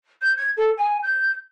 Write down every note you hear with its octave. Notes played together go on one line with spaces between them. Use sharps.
G6
G#6
A4
G#5
G6